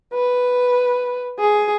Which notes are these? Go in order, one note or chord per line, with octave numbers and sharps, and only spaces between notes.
B4
G#4